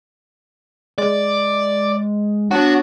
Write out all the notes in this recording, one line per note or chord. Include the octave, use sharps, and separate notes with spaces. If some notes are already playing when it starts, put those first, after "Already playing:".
G#3 D5
F#3 B3 D4 F#4